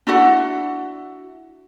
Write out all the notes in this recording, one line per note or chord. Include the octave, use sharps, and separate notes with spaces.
D4 E4 F#4 F#5